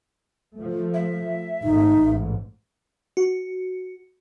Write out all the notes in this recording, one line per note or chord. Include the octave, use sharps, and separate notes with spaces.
F3 A3
E5
G#1 A3 D#4
A1 G#2
F#4